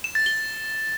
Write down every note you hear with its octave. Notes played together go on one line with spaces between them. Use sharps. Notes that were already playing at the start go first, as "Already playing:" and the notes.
E7
A6
G7